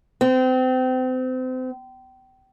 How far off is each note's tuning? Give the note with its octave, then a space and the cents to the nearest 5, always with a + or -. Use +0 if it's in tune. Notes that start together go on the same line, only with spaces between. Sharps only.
C4 -30